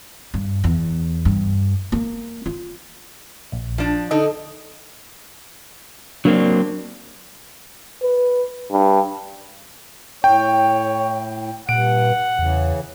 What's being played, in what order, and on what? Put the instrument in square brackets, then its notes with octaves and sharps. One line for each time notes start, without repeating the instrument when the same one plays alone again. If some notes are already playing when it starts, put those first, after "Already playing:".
[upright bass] G2
E2
G2
A#3
F4
[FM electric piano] A#1
[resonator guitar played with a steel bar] F3 D4
[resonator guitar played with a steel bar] D3 D4 D#4 [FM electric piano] A4 D#5
[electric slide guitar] F#3 A#3 C4 [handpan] D4
[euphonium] B4
G2
[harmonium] A2 [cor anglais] C#5 [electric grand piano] G5
[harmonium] G2 [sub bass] A#2 [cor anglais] F#5 [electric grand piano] D7
[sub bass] E2 [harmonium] C#3 E3